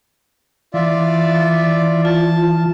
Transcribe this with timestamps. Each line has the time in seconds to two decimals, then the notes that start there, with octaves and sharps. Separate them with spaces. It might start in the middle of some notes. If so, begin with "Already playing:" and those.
0.74 E3 F4 D5 E5
2.05 F4 A5